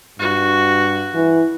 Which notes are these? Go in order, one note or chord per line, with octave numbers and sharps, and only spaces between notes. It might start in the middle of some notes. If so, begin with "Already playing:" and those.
G2 F#4
E3